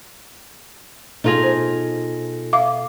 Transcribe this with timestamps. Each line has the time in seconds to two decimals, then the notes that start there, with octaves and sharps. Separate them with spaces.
1.24 B2 D#4 F4 G#4 A4 A#6
1.43 C5
2.53 E5 F5 D6